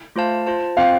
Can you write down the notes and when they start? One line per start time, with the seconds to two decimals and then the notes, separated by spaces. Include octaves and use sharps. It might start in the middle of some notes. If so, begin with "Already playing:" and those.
0.16 A3 F4 C5 F5 A5
0.46 F4 C5 A5
0.77 C4 F4 C5 F5 G5